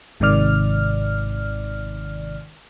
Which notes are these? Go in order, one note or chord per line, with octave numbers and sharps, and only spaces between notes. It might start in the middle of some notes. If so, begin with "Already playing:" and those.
G#1 G#2 C3 D#3 D5 F6